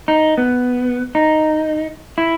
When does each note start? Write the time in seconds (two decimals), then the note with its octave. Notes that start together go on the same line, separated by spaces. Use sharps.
0.08 D#4
0.38 B3
1.15 D#4
2.18 E4